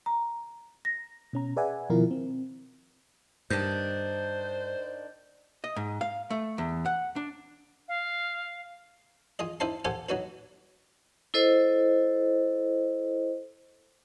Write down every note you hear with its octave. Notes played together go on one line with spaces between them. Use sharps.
A#5
A#6
B2 C#4 A#5
G#4 B4 D5 E5 F#5 G#5
B2 D#3 F3 E4 F4 A#4
C4
G2 D#3 D4 C5 G6
D#5
G#2
F5
A3
E2
F#5
D4
F5
F4 G#4 D#5
D#4 E4 C5 F5 A5 C6
G4 A4 C5 F5 F#5 G#5
F#3 D#4 F#4 B4
E4 A4 C5 D#5